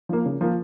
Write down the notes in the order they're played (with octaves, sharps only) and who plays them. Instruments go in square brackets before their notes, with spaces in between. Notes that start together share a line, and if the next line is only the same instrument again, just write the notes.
[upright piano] F3 A#3
C#3
F3 A#3